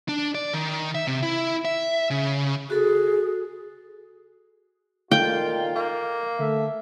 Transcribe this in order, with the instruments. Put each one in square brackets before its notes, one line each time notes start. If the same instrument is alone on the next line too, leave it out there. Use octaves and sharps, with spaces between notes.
[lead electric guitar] D4
D5
D#3
E5
C3
E4
E5
C#3
[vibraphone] F#4 A4 [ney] G#4
[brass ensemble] A#2 D#3 F4 [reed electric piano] A4 F5 [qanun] G5
[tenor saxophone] A#3
[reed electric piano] D3 [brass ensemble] A3 E5